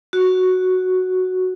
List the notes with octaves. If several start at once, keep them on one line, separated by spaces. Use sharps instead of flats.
F#4